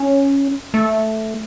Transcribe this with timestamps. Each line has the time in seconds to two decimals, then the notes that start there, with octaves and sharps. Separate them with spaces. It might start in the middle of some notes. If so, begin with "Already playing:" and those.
Already playing: C#4
0.74 A3